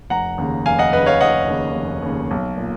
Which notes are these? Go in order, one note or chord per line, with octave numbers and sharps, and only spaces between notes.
F1 F#5 A#5
D#2 C#3
F1 F5 G#5
D#5 F#5
D#2 C#3 B4 D#5
C#5 F5
F1 D#5 F#5
D#2 C#3
F1
D#2 C#3
B1
A#2